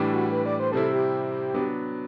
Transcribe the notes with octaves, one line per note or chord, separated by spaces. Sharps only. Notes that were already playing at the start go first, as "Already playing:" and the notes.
Already playing: A2 E3 G3 D4
F#4
B4
D5
C5
C3 G3 C4 E4 A4
G4
F#3 B3 D4